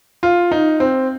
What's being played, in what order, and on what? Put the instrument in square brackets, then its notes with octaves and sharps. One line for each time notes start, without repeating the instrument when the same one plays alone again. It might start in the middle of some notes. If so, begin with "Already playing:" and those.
[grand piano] F4
D#4
C4